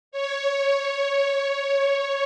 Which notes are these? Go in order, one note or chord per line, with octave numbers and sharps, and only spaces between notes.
C#5